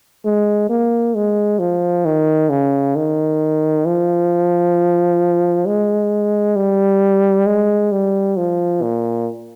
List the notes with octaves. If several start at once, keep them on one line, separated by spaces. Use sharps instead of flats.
G#3
A#3
G#3
F3
D#3
C#3
D#3
F3
G#3
G3
G#3
G3
F3
A#2